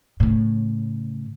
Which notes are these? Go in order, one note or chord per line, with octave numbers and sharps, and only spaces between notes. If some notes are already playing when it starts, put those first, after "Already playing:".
A2 C#3